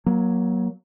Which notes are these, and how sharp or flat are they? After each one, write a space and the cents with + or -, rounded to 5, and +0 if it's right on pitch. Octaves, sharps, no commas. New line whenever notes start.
F#3 +5 A#3 +25